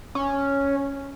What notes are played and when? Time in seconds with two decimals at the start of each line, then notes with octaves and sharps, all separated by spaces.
0.15 C#4